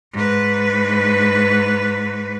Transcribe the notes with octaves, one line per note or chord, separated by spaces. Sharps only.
G#2 B4